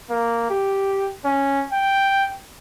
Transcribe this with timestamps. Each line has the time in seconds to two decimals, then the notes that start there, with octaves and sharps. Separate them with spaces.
0.10 A#3
0.51 G4
1.25 C#4
1.72 G5